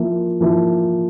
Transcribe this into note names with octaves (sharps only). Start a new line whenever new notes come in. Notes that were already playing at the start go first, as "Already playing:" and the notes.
Already playing: F3 A#3 E4
F3 A#3 E4